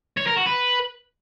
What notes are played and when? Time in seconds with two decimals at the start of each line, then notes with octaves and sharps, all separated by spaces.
0.18 C#5
0.27 A#4
0.37 F#4
0.47 B4